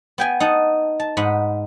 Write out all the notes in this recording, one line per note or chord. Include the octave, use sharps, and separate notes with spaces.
B3 G5 G#5
D#4 F#5 A5
A5
G#2 D#4 F#5 B5